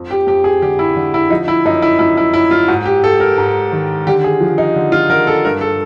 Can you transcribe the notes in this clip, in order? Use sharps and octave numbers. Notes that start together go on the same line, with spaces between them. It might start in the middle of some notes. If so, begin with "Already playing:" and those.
Already playing: F2
G4
F2 G4
G#4
D3 G4
E4
D3
E4
F3 D#4
E4
F#2 D#4
E4
F#2 E4
E4
F#2 E4
F4
G#2 F#4
G4
G#2 A4
A#4
G#2
D#3
D3 G4
G#4
F3
D#4
D3
F4
D3 A#4
A4
G2 A#4
A4